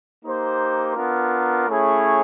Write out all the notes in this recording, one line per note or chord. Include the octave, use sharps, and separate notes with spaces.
A#3 D#4 G4 C5
B3 D4 F4 A#4
A3 C#4 E4 G#4 C#5